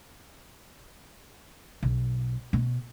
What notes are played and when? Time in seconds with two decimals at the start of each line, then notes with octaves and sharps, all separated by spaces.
1.83 B1
2.53 B2